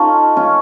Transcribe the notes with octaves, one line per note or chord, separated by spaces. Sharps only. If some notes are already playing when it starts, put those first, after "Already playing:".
Already playing: C#4 D#4 F4 A4
C#4 F4